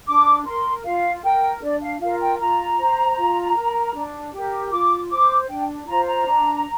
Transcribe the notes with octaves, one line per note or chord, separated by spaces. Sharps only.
D4 D6
A#4 C6
F4 F5
A#4 G5
D4 D5
F5
F4 A#4 F5
G5
F4 A#5
C5
F4
A#4
D4
G4 A#4
F4 D6
C5 D6
D4 G5
F4 C5 A#5
A#5
D4